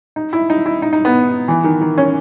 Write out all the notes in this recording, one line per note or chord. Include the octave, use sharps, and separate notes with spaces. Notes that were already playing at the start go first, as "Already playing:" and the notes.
D#4
E4
D#4
E4
D#4
D#4
B3
E3
D#3
D#3
C#4